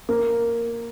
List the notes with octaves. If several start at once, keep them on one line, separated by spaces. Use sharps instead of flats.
A#3